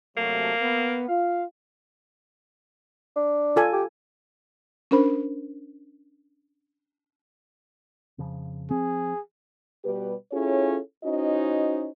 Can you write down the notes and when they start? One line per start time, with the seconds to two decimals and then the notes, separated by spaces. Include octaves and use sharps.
0.17 C3 F#3 A3 A#3
0.62 B3
1.08 F4 F5
3.16 D4
3.56 F4 A4 G#5
3.73 G4
4.91 C#4 D4 A#4 C5 B5
8.18 F2 C#3 F3
8.71 F3 C4 G#4
9.84 B2 G3 G4 B4
10.32 C#4 E4 F4 G#4 A4 C#5
11.03 C#4 D#4 E4 F#4 C5 D#5